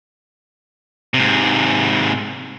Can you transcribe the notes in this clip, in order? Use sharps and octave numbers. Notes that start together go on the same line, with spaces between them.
G#2 C3